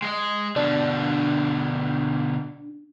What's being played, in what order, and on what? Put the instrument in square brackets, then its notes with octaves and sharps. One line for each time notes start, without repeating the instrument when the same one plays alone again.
[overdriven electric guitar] G#3 D#5
[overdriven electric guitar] B2 D3 [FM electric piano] D4